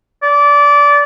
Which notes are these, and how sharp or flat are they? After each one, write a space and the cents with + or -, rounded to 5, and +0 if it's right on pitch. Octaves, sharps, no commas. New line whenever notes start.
D5 -20